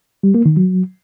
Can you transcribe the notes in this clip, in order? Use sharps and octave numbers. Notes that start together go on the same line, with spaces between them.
G3
A#3
D#3
F#3